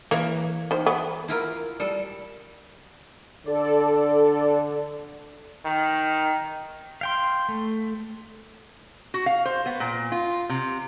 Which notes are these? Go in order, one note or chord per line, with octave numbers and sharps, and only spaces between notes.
E3 A#3 C#5
D#3 C5
B3
E4 F4 A#4
G3 A4
D3 A4 D5
D#3
F5 G5 C6
A3
F#4
F5
C5
B3
A#2
F4
C3